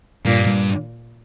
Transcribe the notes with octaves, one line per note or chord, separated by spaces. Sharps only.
G2 A#2
G2